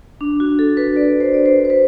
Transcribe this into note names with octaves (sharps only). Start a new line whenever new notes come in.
D4
F#4
A4
B4
D5
C5
D5
C5
C5
B4